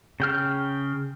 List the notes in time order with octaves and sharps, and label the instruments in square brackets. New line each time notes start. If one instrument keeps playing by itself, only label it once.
[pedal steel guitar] C#3 G5 F6